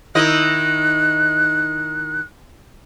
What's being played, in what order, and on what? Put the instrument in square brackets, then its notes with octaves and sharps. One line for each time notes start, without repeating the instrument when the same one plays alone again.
[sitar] D#3 E4 D#5 [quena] F#6